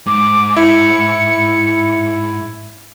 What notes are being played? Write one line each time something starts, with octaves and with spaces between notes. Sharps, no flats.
G#2 D6
E4 C#7